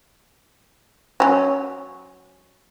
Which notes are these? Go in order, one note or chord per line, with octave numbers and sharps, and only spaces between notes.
F#3 C#4